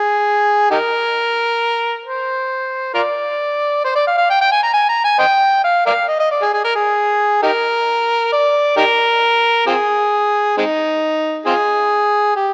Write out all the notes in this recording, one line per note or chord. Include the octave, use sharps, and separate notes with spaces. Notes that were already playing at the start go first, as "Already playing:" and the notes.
Already playing: G#4
D#4 G4 A#4
C5
F4 A#4 D5
C5
D5
F5
F5
G5
G5
G#5
A#5
G#5
A#5
G#5
C5 D#5 G5
F5
A#4 D5 F5
D#5
D#5
D5
G#4
G#4
A#4
G#4
D#4 G4 A#4
D5
D#4 G4 A#4
C4 F4 G#4
G#3 C4 D#4
C4 F4 G#4
G4